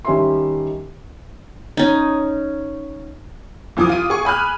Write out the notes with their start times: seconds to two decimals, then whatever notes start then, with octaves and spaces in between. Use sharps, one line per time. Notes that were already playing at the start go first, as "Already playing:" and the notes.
0.05 D#3 G3 C#4 G4 E5 C6
1.77 C#4 D#4
3.77 C2 E3 F3 D6 D#6
3.89 F4 D#7
4.10 G#4 C#6
4.25 G#5 B5 F6 F#6